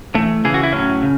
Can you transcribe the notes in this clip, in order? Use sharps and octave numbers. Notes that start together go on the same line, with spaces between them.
C#3 E3 A3
C#3 E3 G#4
F#4
E4
A2 F#3 C#4
C#3